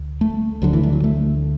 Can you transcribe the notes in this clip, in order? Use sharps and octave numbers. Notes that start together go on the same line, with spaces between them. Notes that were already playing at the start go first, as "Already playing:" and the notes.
Already playing: D2
A3
D2 D3 F#3
E3
E3
F#3
A3